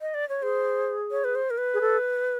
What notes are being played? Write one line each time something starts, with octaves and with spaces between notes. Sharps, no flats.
D#5
D5
C#5
G#4 C5
C#5
B4
C5
A#4
B4
G#4
A4